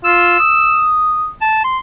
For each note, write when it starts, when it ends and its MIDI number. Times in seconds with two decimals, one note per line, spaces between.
0.05 0.35 65
0.05 0.88 88
0.40 1.30 87
1.41 1.63 81
1.64 1.78 84